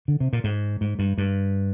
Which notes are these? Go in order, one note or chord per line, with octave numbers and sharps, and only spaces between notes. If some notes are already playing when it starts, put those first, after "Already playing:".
D3
C3
A#2
G#2
G#2
G2
G2